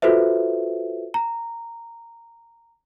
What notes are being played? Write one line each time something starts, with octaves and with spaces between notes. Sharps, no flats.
F4 F#4 A4 B4 C5 E5
A#5